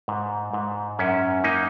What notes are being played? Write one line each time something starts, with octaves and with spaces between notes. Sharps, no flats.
G#2
G#2
F#2 C#4
A#3 D#4